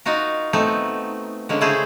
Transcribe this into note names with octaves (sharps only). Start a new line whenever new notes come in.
D#4 F4 F#4 A#4
A3 B3 C4 D#4
D3 G#3 A#3 C#4
C#3 A3 E4 G#4 C5